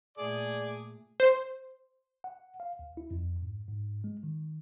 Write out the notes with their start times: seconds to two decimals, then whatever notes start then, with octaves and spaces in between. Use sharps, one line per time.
0.18 A#2 A3 G#4 D5
1.20 C5
2.24 F#5
2.60 F5
2.79 D2
2.97 E4
3.11 F2
3.42 G#2
3.68 G#2
4.04 G#3
4.23 D#3